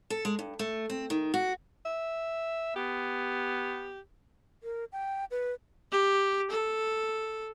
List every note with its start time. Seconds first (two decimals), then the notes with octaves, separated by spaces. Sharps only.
0.10 A4
0.25 G#3
0.39 G2
0.59 A3
0.90 C4
1.10 D#3
1.34 F#4
1.85 E5
2.76 B3 G4
4.63 A#4
4.92 G5
5.31 B4
5.92 G4
6.50 A4